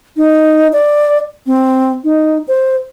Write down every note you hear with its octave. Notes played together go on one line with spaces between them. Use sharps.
D#4
D5
C4
D#4
C5